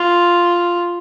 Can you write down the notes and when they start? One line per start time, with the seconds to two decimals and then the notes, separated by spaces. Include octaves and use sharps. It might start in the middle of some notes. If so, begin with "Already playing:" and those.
Already playing: F4